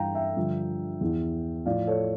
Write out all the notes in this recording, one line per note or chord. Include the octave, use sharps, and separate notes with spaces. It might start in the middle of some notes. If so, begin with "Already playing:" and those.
Already playing: G2 E3 F5 G5 A#5
E5 G5
G2 D3 F3
E2 E3
A2 F3 D5 F5
A4 C#5